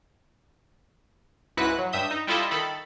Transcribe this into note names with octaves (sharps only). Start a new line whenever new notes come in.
C#2 G#2 E4 F#4 B4 F#6
F#3
G2 E5 D#6 G6
D#4
G3 E4 F4 A4 D#5 E5
D#3 A4 B5